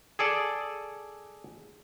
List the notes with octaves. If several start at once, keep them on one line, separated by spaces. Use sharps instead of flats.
G#4 A4 D5